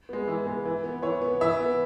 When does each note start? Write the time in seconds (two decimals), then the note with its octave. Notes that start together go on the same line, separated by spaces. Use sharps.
0.09 G#3 B3
0.28 E3
0.46 G#3 B3
0.65 E3
0.84 B3
1.02 E3 C#5
1.21 B3
1.41 E3 E5
1.59 B3